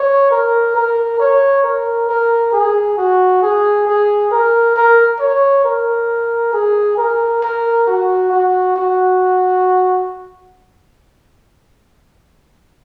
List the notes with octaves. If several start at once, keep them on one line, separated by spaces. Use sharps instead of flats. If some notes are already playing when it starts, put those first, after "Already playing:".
Already playing: C#5
A#4
A#4
C#5
A#4
A#4
G#4
F#4
G#4
G#4
A#4
A#4
C#5
A#4
G#4
A#4
A#4
F#4
F#4
F#4